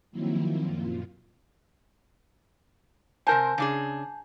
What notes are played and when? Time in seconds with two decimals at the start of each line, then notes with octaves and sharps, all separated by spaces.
0.11 D#3 F3 F#3 A#3 C4 E4
0.61 F#2 A#2 F4
3.27 C3 A#4 C5 G#5 A5 G6
3.58 C#3 D4 G#4